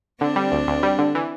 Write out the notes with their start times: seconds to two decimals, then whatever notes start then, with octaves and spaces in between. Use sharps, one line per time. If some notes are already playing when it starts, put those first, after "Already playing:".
0.21 D3 C4 D4
0.36 G3
0.52 D2
0.67 D2
0.83 G3
0.99 D3
1.15 E3